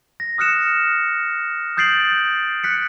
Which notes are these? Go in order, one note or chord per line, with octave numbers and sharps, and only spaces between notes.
A#6
D#6 F6 F#6 C#7 E7
D#6 G6 A6 C7 D7 F#7
F#6 B6 C#7